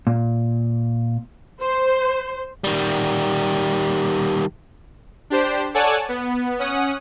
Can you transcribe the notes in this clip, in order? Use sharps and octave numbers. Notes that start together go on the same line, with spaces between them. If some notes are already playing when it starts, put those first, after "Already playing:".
A#2
C5
D#3 G3
D4 G4 C5
A4 C#5 D5 F#5 G#5 A5
B3
C#4 F#5 D#6